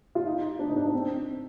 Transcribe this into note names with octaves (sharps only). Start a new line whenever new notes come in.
F4
D#4
D4
D#4
D4
C4